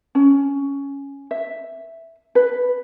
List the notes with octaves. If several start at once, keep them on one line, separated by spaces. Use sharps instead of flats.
C#4
E5
B4